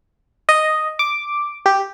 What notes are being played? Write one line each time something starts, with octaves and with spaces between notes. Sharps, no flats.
D#5
D6
G4